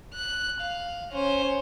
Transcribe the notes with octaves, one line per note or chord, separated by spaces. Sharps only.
F#6
F5
C#4 C5